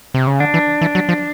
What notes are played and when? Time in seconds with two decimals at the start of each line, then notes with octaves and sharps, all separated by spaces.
0.14 C3
0.27 C#3
0.40 D3 D4
0.54 E3
0.81 E3
0.95 F#3
1.09 F3